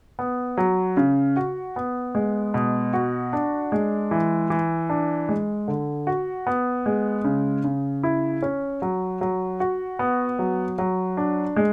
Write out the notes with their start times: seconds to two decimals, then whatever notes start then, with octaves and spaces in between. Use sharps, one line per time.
0.19 B3
0.58 F#3
0.97 C#3
1.36 F#4
1.76 B3
2.15 G#3
2.54 B2
2.93 F#4
3.33 D4
3.72 G#3
4.11 E3
4.50 E3
4.90 D4
5.29 G#3
5.68 D3
6.07 F#4
6.47 B3
6.86 G#3
7.24 C#3
7.64 C#3
8.03 E4
8.42 C#4
8.82 F#3
9.21 F#3
9.60 F#4
9.99 B3
10.39 F#3
10.78 F#3
11.17 D4
11.56 G#3